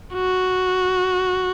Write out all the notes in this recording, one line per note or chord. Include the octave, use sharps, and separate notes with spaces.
F#4